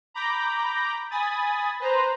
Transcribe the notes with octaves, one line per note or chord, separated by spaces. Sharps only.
A#5 B5 D6 G6 A#6
G#5 B5 D#6 A6
B4 C5 A#5